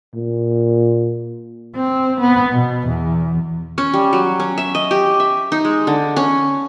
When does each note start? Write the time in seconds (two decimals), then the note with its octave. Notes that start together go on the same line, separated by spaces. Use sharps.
0.15 A#2
1.76 C4
2.20 B3
2.52 B2
2.87 E2
3.78 C#4
3.94 G3
4.13 F#3
4.40 C#4
4.58 E5
4.75 D#5
4.91 G4
5.20 E5
5.52 D#4
5.65 G#3
5.87 D3
6.17 C#4